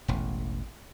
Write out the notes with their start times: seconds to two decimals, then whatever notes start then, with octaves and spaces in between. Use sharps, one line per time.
0.08 E1 A1